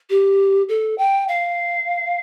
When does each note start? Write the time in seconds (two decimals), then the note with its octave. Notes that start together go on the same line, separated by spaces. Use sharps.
0.10 G4
0.69 A4
0.98 G5
1.28 F5